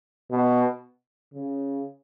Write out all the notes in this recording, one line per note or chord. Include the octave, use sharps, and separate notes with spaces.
B2
C#3